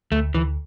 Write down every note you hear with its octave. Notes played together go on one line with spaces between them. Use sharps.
D2 A3
D2 E3